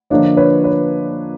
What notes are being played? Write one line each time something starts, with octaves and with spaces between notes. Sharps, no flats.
D3 F3 A#3 D4 F4 C#5 D#5
B4 C#5
B4 C#5